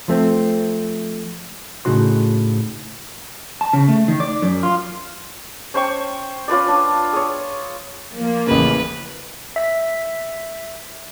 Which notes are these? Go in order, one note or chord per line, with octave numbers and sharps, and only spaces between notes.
F3 A3 C4
A2 C#3 F#3 D#4 F#4 C6
A5
C#3
A3
D#3
D5
F#2
F4
C#4 C5 G5 C#6
C#4 F4 B4 D5
D4
G#4 C#5
F3 A#3
A1 C#3 B4
E5 B6